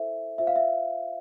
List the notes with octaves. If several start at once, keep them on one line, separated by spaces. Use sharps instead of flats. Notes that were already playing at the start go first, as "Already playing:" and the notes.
Already playing: E4 A4 C5 E5
F4 C5 E5
F5
E5